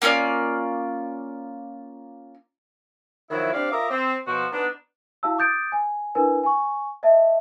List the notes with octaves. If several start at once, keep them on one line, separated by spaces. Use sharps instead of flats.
A#3 C#4 F4 D5
D#3 F3 F#3 E4
C4 D4 G4 D5 F5
F4 A#4 D#5 E5 A#5 D6
C4
B2 F3 F#4
B3 D4 D#4
E4 F#4 F5 A5 E6
D6 D#6 G6 A6 D7
G#5
D4 E4 A#4 B4 G#5
G#5 C#6
D#5 E5 A5